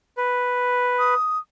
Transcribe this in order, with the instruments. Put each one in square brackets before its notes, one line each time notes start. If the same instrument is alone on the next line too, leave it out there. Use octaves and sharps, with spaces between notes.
[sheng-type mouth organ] B4
[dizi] D#6